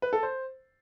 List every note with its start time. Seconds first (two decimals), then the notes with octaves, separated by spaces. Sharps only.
0.02 B4
0.13 A4
0.23 C5